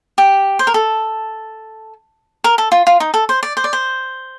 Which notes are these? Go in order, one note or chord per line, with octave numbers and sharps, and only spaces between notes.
G4
C5
A#4
A4
A#4
A4
F4
F4
D#4
A4
C5
D5
C5
D5
C5